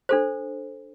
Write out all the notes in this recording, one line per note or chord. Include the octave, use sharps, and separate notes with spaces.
D4 A4 C5